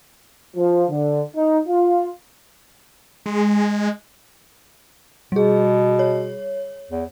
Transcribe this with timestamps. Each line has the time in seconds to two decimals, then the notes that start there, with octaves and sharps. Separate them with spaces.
0.56 F3
0.89 D3
1.36 D#4
1.68 F4
3.26 G#3
5.32 B2 G3 G#4
5.99 C#5
6.91 E2